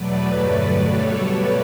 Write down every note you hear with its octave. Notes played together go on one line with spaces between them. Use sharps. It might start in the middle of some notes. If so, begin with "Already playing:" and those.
Already playing: E2 B2 F#3 A3 B4 D5
G2 D3 F#3 A3
B2 G3 A4 C#5
B2 A3 B4 D5